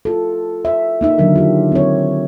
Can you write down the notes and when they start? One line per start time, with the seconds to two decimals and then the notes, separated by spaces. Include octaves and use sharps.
0.05 F4 A4
0.65 E5
1.01 A#3 D#4 E5
1.18 D3 D#3 F#3 D4 A#4
1.36 F4 G4
1.72 C4 C#5